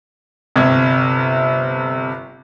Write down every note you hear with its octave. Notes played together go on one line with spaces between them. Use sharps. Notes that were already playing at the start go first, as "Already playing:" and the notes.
G1 C3 G#6